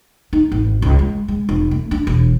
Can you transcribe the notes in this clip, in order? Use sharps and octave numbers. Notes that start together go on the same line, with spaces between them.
D#4
G#1
C#2
G#3
G#3
F1
A3
D4
E1